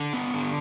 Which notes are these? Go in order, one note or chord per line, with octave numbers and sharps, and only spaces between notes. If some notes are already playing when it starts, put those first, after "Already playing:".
Already playing: D3
B3
D3